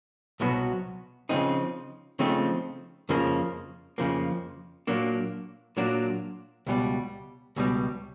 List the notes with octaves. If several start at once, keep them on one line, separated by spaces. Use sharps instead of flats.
C2 B2 F#3 B3
C#3 F3 A3 C4 D#4
C#3 F3 A3 C4 D#4
F2 C#3 F3 A#3
F2 C#3 F3 A#3
A#2 F#3 A#3 D4
A#2 F#3 A#3 D4
C#2 B2 G3
C#2 B2 G3